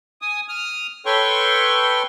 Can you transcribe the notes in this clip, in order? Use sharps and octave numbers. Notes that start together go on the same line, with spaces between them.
G#5 D#6
D#6 F6
A4 B4 C#5 G5 C6 C#6